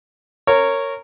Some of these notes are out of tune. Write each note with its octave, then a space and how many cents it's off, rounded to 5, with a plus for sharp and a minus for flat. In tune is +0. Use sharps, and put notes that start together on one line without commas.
A#4 -15 C#5 -5